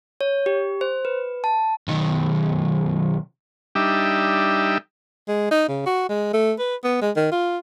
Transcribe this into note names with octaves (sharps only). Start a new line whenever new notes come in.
C#5
G4
C5
B4
A5
B1 D#3
G3 D4 D#4 G4 E5
G#3
D#4
C#3
F#4
G#3
A3
B4
B3
G#3
D#3
F4